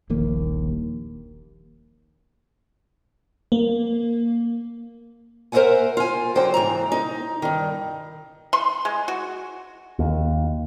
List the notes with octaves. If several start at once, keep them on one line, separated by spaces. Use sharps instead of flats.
D#1 A#1 D#2 A#3
A#3
A#4 C5 D5 E5 F#5 G#5
F4 G#5
D3 F#3 C5 G5
G#2 E3 A#5
D#4
G2 D#3
C6
G#3
F#4
D#2